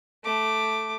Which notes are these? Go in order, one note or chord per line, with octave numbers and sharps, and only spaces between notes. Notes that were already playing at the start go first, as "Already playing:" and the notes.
A3 D6